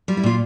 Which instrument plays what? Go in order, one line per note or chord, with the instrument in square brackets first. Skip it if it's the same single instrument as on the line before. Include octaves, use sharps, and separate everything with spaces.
[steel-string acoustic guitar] G3 F4
E4
A#2 F4